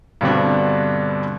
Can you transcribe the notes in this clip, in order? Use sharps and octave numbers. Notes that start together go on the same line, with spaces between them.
G2 B2 D3 C4 D4